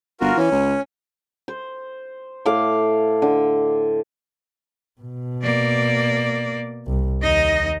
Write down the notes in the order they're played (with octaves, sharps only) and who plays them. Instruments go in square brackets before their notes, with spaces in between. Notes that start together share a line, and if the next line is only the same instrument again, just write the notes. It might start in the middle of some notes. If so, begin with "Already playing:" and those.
[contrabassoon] G1 [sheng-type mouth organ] F4 F#4 A#4
[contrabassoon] E3 [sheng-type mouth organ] C#4
[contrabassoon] C#2
[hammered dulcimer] C5
A2 A4 F5 D6
D3
[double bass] B2
[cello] A#3 D5
[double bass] C2
[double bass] D#2 [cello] D#4 D#5